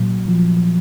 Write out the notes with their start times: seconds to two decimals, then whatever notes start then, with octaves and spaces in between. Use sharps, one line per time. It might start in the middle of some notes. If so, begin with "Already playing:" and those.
Already playing: A#2 F#3
0.28 F3